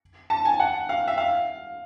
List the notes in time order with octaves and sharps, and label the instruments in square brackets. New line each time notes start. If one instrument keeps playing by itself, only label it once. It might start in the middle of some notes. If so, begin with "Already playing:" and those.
[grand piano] A5
G#5
F#5
F5
E5
F5